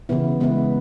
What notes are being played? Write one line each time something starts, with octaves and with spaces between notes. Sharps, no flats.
C#3 E3 B3 E4
G#3 B3 E4 B4